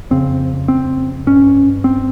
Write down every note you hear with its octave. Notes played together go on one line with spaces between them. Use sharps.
F2 C#3 C4
C4
G2 C#4
C4